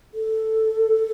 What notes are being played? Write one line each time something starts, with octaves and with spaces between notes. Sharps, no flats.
A4